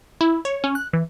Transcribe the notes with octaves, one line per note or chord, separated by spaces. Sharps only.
E4
C#5
C#4
F#6
E3